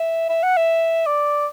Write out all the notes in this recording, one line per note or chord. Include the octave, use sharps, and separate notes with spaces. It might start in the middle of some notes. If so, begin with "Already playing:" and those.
Already playing: E5
E5
F#5
E5
D5